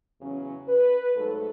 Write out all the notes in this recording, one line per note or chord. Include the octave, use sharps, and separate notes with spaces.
E2 C#3 F#3 C#4
B4
G#2 F#3 A3 D#4 A4